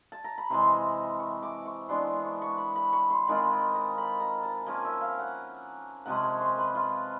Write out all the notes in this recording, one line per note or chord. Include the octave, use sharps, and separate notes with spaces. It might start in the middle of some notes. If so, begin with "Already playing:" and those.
A5
A#5
B5
C3 E3 G#3 C6
C#6
D6
C#6
E3 G#3 B3 D4 C6
C#6
C#6
B5
B5
C#6
C6
D#3 G#3 C4 F4 B5
A#5
B5
A#5
A5
F3 A#3 C#4 G#5
E5
F5
F#5
C3 F3 G#3 C#4 F#5
C#5
C5
B4
F4